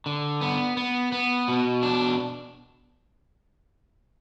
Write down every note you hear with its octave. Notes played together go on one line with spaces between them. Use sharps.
D3
B3
B3
B3
B2
D4